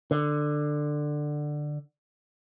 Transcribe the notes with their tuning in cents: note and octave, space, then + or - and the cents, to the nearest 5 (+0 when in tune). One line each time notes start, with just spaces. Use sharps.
D3 +15